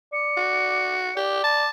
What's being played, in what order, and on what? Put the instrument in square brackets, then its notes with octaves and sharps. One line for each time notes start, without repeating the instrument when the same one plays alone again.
[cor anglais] D5 [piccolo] C#7
[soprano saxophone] F#4
[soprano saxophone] G4 [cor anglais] D5
[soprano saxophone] A5